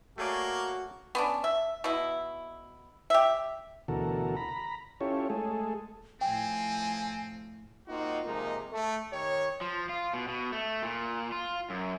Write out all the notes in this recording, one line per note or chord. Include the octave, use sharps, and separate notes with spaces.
A3 A#3 F#4 G#4 C#5 D5
B3 C#4 D4
E5
B2 E4
G4 E5
D2 B2 E3 F#4 A4 A#4
A#5 B5
C#4 E4 F4 G4 A4 C#5
G#3 A3 G#4 A4
A2 F3 C4 G5 G#5
A#3 C4 D#4 F4 F#4
C3 F3 G#3 A#3 D#4
A3
D#3 G4 C#5
F3
F4
B2
B2
A3
A#2
F4
F#2